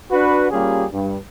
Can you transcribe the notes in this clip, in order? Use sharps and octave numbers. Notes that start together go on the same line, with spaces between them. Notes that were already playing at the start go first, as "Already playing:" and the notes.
D4 F#4 B4
G3 A#3 C#4 F4 G4 G#4
G2